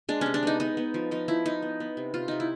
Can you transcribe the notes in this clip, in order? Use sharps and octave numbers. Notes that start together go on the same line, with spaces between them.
G#3 D4
C3 C#4
D4
B3 D#4
B3 D#4
B3
F3
F3 D#4
F3 E4
F3 D#4
B3
B3
C3
C3 F4
C3 D#4
E4